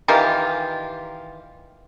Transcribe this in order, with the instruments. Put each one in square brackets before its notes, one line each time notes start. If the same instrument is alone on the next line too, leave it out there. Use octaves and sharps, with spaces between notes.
[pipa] D#3 E3 F4 G4